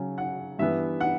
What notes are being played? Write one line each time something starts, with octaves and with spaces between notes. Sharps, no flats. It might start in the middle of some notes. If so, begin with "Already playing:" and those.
Already playing: C#3 F#3 C#4
F#5
G2 E3 B3 E5
F#5